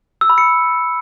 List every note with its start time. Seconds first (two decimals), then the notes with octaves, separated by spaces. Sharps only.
0.21 E6
0.30 B5
0.38 C#7